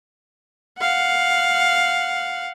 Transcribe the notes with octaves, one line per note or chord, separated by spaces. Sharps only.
F5 F#5